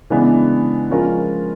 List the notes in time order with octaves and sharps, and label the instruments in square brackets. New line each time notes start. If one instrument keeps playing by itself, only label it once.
[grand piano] C#3 E3 G#3 B3 D4
F3 G#3 C#4 F4 A#4